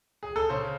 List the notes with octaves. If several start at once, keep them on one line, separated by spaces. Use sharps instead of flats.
G#4
A4
C#3 C5